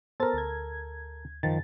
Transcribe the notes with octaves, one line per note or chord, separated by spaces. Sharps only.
B3 A4 A#4 C5 A6
D2 G#6
F#2 D#3 F3 A6